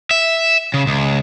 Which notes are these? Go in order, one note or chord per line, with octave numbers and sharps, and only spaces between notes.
E5
C#3
C#2